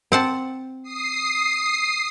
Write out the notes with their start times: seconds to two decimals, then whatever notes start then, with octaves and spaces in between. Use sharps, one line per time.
0.12 C4 F#5 A5
0.83 D#6 C7